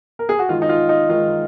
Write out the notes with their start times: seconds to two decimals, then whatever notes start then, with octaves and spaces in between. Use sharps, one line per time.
0.19 A#4
0.29 G#4
0.39 F#4
0.49 D#3 G#3 F4
0.62 D#4
0.69 F4
0.89 D#4
1.09 D#3 G#3 F4